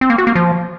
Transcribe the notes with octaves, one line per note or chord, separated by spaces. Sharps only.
C4
A#3
F#4
A#3
F3